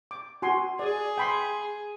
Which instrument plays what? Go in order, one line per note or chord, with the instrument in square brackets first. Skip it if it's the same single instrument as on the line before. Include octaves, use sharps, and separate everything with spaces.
[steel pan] D6
F#4 G#5 C6
[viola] G#4 [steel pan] D5
[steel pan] G5 B5 C6